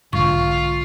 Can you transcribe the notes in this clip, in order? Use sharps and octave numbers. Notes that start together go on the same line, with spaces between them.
B1 G#2 D3 F4 C#6